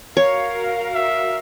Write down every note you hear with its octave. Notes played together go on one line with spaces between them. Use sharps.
F#4 A#4 C#5 F5
E5